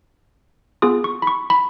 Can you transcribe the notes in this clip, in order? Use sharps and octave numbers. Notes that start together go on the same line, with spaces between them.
B3 F4 G#4 D#6
C#6
B5
C#6
B5